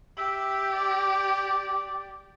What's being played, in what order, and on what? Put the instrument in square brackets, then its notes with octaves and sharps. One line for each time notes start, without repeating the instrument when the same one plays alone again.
[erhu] G4 [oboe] E5
[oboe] D5